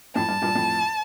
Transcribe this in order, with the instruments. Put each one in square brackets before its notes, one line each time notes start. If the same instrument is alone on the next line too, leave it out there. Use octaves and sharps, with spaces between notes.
[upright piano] F2 A2 [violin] A5
[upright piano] G2
G2 A#2
F2 A2